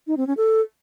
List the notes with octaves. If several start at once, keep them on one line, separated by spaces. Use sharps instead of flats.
D#4
C4
C#4
A4